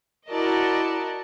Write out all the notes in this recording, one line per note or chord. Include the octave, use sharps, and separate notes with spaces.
E4 F#4 A#4 D5 D#5 A5